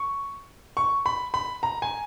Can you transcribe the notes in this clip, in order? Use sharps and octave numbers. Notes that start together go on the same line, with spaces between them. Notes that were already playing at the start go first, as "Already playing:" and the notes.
Already playing: C#6
C#6
B5
B5
A#5
G#5